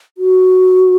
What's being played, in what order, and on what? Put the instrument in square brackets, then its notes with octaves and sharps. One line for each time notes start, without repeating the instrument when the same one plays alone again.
[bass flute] F#4